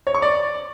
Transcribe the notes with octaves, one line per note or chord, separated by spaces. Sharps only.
C#5
C#6
D5